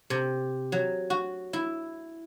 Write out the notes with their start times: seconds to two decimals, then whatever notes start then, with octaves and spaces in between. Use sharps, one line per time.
0.10 C3
0.72 F#3
1.10 F#4
1.53 E4